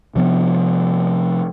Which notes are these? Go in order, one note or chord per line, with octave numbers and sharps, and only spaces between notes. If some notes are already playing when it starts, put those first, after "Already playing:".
C3 F3 B3